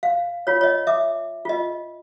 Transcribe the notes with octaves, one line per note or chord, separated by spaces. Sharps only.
F5
F4 C#5
C#5 D#5
E5 D6
F4 D#5